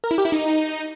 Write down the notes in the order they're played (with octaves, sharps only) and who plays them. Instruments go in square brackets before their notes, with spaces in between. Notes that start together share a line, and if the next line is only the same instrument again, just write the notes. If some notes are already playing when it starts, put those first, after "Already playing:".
[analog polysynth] A#4
E4
G4
E4
D#4